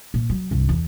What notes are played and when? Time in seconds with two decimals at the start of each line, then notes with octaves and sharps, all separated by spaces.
0.14 A#2
0.30 F#3
0.51 C2 G2
0.69 E2